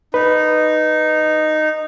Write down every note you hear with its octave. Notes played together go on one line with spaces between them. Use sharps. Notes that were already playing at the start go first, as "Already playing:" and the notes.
D#4 B4